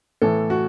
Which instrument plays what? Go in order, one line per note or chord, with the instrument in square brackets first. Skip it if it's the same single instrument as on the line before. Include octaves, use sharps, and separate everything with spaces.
[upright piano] A2 E3 A4
F#4